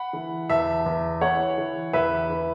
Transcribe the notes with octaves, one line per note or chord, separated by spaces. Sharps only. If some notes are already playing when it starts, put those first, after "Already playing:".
Already playing: F#5 B5
E3
E2 E5 A5
E2
E3 C#5 F#5
E3
E2 B4 E5
E3